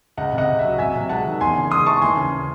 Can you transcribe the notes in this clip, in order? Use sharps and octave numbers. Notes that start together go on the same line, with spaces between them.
C#2 D#5 F#5
C3
D#5 F#5
C#2
F#3 E5
C2 E5 G#5
C3
G#3 F#5 A5
D#3
E2 G#5 C6
C#3
G#3 C6 D#6
E3 A5 C#6
D#2 G#5 C6
C#3